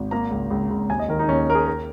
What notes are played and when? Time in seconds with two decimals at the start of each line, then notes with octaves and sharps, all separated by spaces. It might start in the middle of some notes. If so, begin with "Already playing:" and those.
Already playing: G#1
0.11 A#3 A#5
0.31 C#2
0.50 C#2
0.70 C#2
0.89 D#2 G#5
0.99 D#5
1.08 D#3 A#4
1.19 D#4
1.28 D#2 C#4
1.47 D#2 A#4
1.55 G#4
1.67 A#4